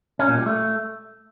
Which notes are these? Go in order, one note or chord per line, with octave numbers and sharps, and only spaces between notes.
C#4
A#2
G3
A3